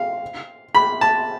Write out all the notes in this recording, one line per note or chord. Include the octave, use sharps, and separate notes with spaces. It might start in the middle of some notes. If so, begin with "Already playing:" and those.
Already playing: F5
B5
A5